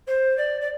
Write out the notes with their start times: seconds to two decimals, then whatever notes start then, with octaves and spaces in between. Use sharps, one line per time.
0.07 C5
0.37 D5
0.61 D5